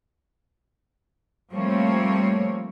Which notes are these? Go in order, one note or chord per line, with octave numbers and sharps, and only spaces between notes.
F3 G3 A3 A#3 C4 C#5